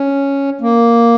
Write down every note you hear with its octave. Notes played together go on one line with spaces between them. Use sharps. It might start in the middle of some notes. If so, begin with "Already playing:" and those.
Already playing: C#4
A#3